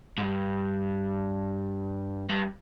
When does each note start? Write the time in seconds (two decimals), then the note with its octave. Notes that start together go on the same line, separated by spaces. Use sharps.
0.18 G#2
0.22 G2
2.29 G2